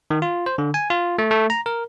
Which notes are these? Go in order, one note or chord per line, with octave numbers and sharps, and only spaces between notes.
D#3
F4
C5
D3
G#5
F4
A3
A3
A#5
A#4